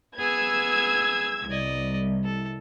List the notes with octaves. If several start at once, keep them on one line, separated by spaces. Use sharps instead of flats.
B3 G#4 E6 G#6
C2 D5 D#5
A4